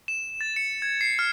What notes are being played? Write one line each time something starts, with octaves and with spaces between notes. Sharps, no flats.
E7
A6
C#7
G#6
C7
F6